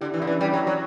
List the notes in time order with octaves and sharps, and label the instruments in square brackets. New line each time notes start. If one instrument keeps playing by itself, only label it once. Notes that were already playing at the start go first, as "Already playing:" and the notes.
[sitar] D3 [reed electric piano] E4 G4
[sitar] E3 [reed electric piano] D4
[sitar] D3 [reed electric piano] C#4 E4
[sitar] E3
G3
F#3
F#3